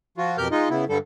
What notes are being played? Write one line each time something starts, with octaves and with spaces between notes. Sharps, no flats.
F3 F4 F#4
F2 B2 G4 A#4 F6 G6
G#3 D#4 F4 D#5
C#3 B3 E4
G2 D3 G3 A4